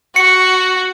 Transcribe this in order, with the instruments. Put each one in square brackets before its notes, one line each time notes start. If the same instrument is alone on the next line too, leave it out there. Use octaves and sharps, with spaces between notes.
[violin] F#4 [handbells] C#7